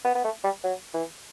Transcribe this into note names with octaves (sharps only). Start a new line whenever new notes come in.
B3
B3
A3
G3
F#3
E3